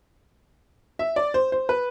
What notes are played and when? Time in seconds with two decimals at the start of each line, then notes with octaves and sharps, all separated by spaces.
0.99 E5
1.16 D5
1.34 C5
1.52 C5
1.69 B4